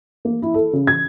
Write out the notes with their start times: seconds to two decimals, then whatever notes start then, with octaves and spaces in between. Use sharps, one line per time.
0.25 A#3
0.42 E4
0.54 A4
0.73 C#3
0.87 G#6